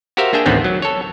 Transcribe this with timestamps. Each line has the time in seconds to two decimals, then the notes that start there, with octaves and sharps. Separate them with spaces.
0.17 F#4 G4 A#4 C5 E5 F5
0.33 A#3 D4 G#4 E5 G5
0.46 A1 D2 D3 D#3 B3 C4
0.64 F#3
0.82 A4 C#5